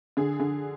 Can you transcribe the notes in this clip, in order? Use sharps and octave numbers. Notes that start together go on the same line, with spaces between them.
D3 G#4
D3